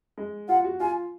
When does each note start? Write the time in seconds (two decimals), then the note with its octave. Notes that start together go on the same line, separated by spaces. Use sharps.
0.18 G#3
0.49 F4 F#5
0.64 F#4
0.80 F4 G#5